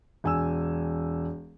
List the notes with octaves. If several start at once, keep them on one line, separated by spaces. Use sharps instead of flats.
E1 G#5 E6